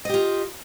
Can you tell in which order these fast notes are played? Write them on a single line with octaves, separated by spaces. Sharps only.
D#5 G4 F4